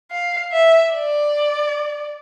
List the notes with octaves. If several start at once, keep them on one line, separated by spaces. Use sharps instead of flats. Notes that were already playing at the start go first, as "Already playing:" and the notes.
F5
E5
D5